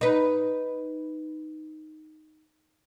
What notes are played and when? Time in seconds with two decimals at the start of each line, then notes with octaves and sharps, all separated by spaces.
0.01 D#4 B4